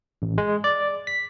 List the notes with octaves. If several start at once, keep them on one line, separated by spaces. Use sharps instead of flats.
A1
G#3
D5
B6